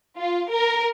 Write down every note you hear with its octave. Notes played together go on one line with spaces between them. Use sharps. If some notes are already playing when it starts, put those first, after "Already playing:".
F4
A#4